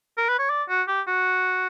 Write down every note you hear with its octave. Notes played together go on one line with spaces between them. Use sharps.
A#4
B4
C#5
D5
F#4
G4
F#4